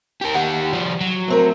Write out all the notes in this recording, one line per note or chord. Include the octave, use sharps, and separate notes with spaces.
G4 A#4
D#3 G4 F#5
F3 G3
F#3
A2 C4 A#4